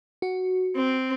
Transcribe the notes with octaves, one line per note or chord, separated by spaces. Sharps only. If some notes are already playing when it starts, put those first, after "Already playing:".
F#4
C4